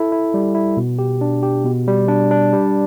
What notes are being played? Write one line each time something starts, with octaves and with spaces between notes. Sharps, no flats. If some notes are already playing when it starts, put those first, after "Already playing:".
Already playing: E4 A4
E4
G3
E4
B2
G4
D4
G4
B2
G3
D4
D4
G3